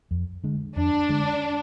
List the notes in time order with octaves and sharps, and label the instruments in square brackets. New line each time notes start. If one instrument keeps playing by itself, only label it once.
[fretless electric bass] F2
D3 G#3
[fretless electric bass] F2 [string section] D4
[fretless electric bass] D3 G#3